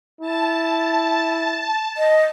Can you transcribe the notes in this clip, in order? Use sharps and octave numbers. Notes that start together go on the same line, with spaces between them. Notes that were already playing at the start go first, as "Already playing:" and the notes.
E4 A5
D#5